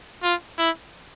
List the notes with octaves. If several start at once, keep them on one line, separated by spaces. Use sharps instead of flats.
F4
E4